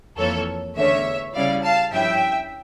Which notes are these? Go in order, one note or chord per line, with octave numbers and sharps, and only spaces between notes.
F2 E3 A#3 A4 C#5
E2 D3 A3 C#4 C#5 E5
C#3 G3 C#4 E4 D5 F5
F5 A5
G2 F3 C#4 E4 E5 G5